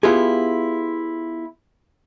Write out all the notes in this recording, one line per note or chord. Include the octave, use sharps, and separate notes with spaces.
B3 E4 F4 G4 G#4